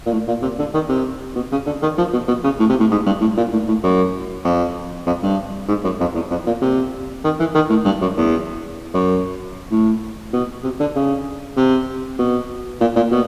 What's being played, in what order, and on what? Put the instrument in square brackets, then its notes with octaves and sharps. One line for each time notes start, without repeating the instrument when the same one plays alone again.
[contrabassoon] A#2
A2
A#2
C3
D3
D#3
C3
B2
C#3
D3
D#3
F3
B2
B2
C#3
A2
C3
A2
G#2
G2
A2
A#2
A2
A2
F#2
F2
F2
G2
G#2
F#2
F2
E2
F2
A#2
C3
D#3
E3
D#3
A2
G2
F#2
E2
F#2
A2
B2
C3
D3
C#3
C3
B2
A#2
A#2
B2